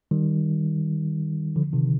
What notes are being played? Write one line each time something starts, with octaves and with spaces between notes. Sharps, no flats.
D#3 G3
D3 F3
C3 D#3